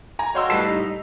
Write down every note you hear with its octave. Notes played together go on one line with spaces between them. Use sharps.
G#5 A#5
F#4 C#5 D#5 F5 G5 C6 E6
A2 G3 A4 B4 A5 B6 C7
D#4